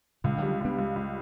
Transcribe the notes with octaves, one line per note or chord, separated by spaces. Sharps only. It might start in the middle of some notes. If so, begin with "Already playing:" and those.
C#2 A#2 C#3
D3 F#3 G3
C#2 B3 D4
C#2
C#2